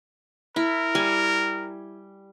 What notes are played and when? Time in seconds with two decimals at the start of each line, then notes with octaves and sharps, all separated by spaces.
0.56 E4 A#4
0.95 G3 G#5